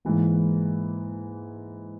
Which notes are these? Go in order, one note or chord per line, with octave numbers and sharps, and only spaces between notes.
G#2 E3 A#3